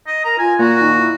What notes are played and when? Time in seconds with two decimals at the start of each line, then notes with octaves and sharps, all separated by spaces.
0.07 D#5
0.24 A#4 A#5
0.39 F4 G#5
0.59 A#2 F#4
0.78 D#3
0.97 E4